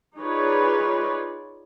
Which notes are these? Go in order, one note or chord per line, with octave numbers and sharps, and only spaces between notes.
D#4 F4 G#4 B4 C#5 D5